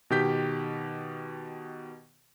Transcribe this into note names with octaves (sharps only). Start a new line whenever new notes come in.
B2 D#3 G4 G6 B6